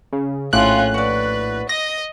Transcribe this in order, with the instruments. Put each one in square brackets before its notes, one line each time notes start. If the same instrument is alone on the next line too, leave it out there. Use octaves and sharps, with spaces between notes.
[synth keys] C#3
[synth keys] A#1 A2 F#6 [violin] C#4 F4 [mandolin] F5 G5 C6
[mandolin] F#4 D5 [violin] B4
[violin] D#5 [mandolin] D#6 [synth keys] A#6